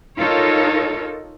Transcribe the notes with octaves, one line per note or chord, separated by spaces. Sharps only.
D#4 F4 A4 A#4 C#5